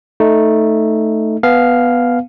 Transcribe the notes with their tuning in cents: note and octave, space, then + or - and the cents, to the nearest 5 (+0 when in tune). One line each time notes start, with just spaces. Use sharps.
A3 +0 D#4 +0
B3 +0 F5 +0 G#5 +35